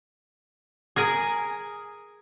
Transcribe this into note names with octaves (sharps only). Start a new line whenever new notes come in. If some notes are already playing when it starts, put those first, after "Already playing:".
G#4 A#4 G#5